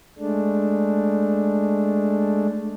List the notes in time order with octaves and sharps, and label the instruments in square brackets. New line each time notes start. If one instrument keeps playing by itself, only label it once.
[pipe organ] G#3 A3 D4